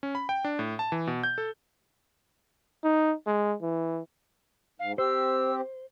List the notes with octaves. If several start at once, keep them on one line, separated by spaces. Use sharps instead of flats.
C#4
B5
G5
D4
A2
A5
E3
B2
G6
A4
D#4
G#3
E3
G#2 F5
C4 G4 C5 E6